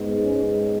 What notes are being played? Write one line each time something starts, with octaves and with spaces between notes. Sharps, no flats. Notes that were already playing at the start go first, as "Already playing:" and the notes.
Already playing: G#2 G#3 B3
C#4